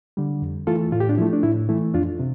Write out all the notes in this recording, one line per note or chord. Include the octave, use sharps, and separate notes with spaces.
D3 G3
F2
E3 A3 F4 A4
A2 F4
G4
D4 F4
F3 A3 E4
D4
A2 E4
E3 A3 E4
F2 D4 F4
C3